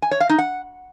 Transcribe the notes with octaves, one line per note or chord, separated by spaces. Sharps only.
G#5
C#5
F5
D#4
F#5